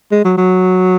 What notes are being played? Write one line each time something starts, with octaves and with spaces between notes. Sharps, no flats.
G#3
F#3
F#3